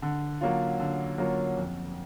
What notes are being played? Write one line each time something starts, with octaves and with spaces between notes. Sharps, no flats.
D3
F#3 A#3 C#4 F4
D3
F#3 A#3 C#4 F4
F2